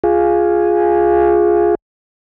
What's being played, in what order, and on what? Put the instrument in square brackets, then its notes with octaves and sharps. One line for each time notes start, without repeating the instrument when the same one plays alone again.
[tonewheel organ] F4 G#4